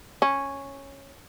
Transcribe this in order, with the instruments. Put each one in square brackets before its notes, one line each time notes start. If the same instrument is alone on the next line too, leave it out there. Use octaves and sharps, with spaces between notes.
[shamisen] C#4